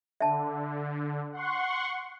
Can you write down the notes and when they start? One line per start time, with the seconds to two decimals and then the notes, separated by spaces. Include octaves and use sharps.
0.20 D3 E5 A5
1.32 F#5 C6 C#6